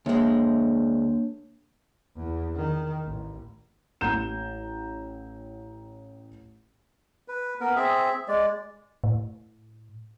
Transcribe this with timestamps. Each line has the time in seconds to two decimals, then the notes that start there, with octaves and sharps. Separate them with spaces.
0.06 D2 G#3 A#3 D4 C#5
2.16 E2
2.55 D#3
3.05 A1
4.01 A1 A#5 G6 E7
7.28 B4
7.61 B3 A#4
7.76 C4 G#4 E5
8.28 G#3 D5
9.04 A2